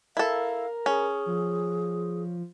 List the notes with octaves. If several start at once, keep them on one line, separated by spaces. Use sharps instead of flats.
E4 A4 A#4 F5
C#4 G#4
F3